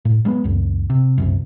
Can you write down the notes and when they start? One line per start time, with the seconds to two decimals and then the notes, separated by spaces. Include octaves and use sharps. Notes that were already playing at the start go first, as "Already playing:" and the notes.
0.05 A2
0.25 F#3 G#3 A#3 B3
0.44 C#2 F#2
0.90 C3
1.18 G1 C2 F#2